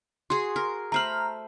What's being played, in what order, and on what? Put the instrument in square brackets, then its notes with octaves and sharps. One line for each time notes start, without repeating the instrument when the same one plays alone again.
[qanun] F#4 G#4 [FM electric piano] C6
[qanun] A#4
[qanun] A3 C5 B5 [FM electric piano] A#5 F6